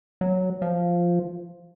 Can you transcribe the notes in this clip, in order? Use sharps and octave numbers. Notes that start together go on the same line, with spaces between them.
F#3
F3